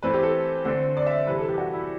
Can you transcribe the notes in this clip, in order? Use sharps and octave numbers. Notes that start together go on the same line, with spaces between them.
E3 A3 C4 B4
G4
A4
D3 A3 C4
D5
E5
C3 E3 G3 B4
A4
G4
F#4
E4